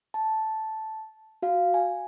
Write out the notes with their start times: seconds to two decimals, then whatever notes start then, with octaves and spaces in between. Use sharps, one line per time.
0.14 A5
1.42 F#4 F5
1.74 G#5